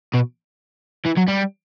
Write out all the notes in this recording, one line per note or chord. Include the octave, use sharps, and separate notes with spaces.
B2
E3
F#3
G3